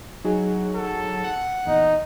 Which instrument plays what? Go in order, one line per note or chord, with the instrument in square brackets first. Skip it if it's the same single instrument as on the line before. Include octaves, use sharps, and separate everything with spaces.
[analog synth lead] F#3 [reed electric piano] D#4 F#4 G#4
[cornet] A4
[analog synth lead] F#5
[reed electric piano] E2 A#2 [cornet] D#4 [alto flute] D#5